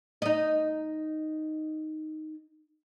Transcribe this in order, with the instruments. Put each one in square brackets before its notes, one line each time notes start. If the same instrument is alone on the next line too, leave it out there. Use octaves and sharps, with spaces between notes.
[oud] D#4 D#5